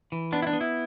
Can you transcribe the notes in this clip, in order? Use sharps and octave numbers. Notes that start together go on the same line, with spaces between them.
E3
B3 D4
E4
D4
B3
E4